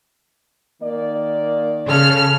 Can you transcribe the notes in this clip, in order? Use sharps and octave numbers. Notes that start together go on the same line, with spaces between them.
D#3 A#3 D5
C#3 A4 F6